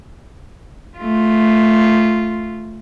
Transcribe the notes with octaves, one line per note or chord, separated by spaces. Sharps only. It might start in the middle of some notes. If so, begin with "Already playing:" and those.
A3 F4